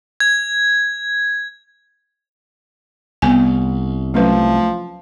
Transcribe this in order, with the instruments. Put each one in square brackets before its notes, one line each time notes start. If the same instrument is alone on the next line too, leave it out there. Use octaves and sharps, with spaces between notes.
[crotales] G#6
[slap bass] C2 [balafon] B3 G#5
[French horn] F3 [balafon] F#3 C#4 B4 [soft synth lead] A3